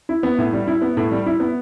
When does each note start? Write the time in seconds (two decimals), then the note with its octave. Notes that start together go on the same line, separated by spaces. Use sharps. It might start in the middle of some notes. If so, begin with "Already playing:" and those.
0.09 E4
0.23 B3
0.38 A2
0.53 G3
0.67 E4
0.82 B3
0.97 A2
1.11 G3
1.26 E4
1.40 B3